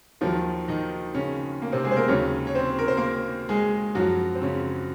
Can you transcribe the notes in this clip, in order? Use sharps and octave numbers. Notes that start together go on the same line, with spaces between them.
D#2 D#3 F3 F#3 F4
D#3 D#4
C#3 C#4
A#3
C3 C4
G#3 G#4
C5
A#3 A#4
D#2 C#3 F#3 C#4 C#5
C#5
C4 C5
A#4
C5
A#3 A#4
G#3 G#4
F#2 F3 F#3 F#4
C4
C#3 C#4